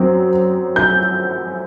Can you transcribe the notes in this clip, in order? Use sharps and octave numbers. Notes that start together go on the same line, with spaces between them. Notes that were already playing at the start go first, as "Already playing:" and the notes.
Already playing: F#2 F#3 C4
G6